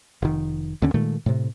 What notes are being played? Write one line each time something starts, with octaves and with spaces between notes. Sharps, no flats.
F1 D#3
D#2 D3 C#4
A#2 D#3 G#3 A3
A2 C3